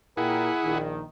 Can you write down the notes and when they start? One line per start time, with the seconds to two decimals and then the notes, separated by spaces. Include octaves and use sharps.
0.17 A#2 E4 G#4 A#4 F#5 G5
0.64 A#1 D#3